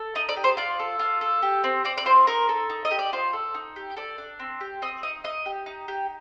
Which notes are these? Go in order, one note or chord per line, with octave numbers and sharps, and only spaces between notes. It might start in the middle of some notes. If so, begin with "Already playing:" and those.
Already playing: A4
D#4 D#5
D5
G4
C5
F4 D5
A4
F4
A4
G4
C4
C4 D5
D5
F4 C5
D#4 A#4
A4
D#4
D#5
G4
D5
F4 C5
A4
D#4
G4
A4 D5
D4
C4
G4
C4 D#5
D#4 D#5
D#4 D#5
G4
D#4
G4